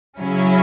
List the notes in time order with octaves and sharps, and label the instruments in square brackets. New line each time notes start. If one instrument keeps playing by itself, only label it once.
[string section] C#3 F#3 C#4 E4